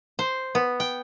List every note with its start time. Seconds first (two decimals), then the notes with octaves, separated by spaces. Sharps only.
0.19 C5
0.55 B3
0.80 G5